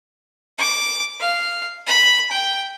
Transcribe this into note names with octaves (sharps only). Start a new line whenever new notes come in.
D6
F5
B5
G5